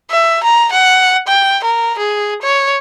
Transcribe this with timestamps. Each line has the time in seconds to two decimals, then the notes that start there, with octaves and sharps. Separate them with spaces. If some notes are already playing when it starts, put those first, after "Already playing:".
0.11 E5
0.43 A#5
0.72 F#5
1.27 G5
1.64 A#4
1.98 G#4
2.42 C#5